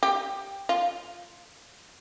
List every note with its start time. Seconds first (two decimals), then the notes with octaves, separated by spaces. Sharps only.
0.03 G4
0.69 F4